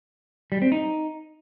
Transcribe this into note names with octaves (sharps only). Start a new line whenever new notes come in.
G3
C4
D#4